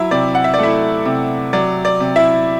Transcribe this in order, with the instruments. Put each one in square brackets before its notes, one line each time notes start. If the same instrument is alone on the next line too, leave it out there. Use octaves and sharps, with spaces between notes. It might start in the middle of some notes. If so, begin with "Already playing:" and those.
Already playing: [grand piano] F#3 E4 E5
C3 D5
F#5
E5
D5
A3 E4 E5
C3
F#3 D5
D5
C3
E4 E5